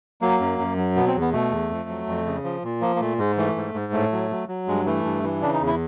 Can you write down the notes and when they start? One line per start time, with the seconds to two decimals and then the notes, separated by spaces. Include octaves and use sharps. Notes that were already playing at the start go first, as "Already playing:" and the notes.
0.21 F#3 A#3
0.40 F#2
0.59 F#2
0.77 F#3
0.96 B2 B3
1.08 C4
1.14 E2
1.21 B3
1.33 B2 A3
1.51 E2
1.70 F2
1.89 F#3
2.07 F2
2.26 C#3
2.44 F3
2.63 A#2
2.81 F3 A#3
2.96 A#3
3.00 A#2 A3
3.19 G#2 G#3
3.37 E3 A3
3.56 G#2
3.74 G#2
3.93 A2 A3
4.12 F#3
4.31 F#3
4.48 F#3
4.68 G2 G#3
4.86 E3 A3
5.05 G2
5.23 E3
5.42 C#3 D4
5.54 D#4
5.60 E2
5.67 E4